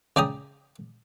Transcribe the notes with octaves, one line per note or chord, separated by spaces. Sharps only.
C#3 D5 G5 A#5 D#6